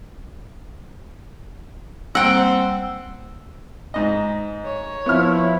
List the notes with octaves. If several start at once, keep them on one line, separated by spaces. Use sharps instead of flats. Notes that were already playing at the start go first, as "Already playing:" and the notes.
G3 A#3 C4 F#5 G5 E6
G#2 D#5
C#5
F3 B3 E4 F6